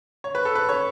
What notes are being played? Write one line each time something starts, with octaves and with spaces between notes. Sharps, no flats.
C#5
B4
A4
B4
C#5